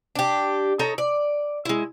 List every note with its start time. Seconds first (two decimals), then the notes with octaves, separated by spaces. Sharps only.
0.15 D4 G4
0.79 D#4 A4 C#5 A#5
0.98 D5
1.65 G#3 E4